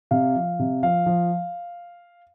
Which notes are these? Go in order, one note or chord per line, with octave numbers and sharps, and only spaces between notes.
C3 F5
F3
C3
F3 F5
F3